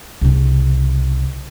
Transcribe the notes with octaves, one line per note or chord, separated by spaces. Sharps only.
C2 C#3